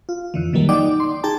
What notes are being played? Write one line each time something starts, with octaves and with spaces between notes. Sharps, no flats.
F4
F2 D3 E3
A#2 D#3 E3 F#3 G3 A#3
D#4 D5 D#5 F#5 G5 D6
C6 D6
D#4 G#4 G5 A5 A#5